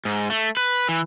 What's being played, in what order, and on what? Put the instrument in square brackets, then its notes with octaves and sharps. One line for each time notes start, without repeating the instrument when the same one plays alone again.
[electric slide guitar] G#2
A3
B4
E3